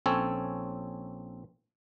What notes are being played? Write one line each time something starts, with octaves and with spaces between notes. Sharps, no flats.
A#1 C4 C#4 A4 C#5 G#5